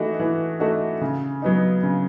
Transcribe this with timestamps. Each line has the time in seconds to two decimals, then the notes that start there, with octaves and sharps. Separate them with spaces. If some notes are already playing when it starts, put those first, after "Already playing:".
Already playing: E3 A3 D#4 F#4
0.20 E3
0.60 A3 D#4 F#4
1.01 C#3
1.42 F#3 B3 D#4
1.83 C#3